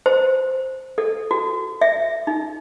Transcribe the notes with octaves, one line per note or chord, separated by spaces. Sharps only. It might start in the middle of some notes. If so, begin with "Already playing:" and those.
C5
A4
F#4
E5
D#4